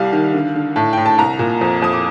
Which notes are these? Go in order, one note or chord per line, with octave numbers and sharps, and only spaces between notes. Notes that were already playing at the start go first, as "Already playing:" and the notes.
Already playing: C2 G3 F5
D#3
D3
D3
A2 A5
A2 G5
A5
C2 A#5
A#2
F2
F2 D#6
D6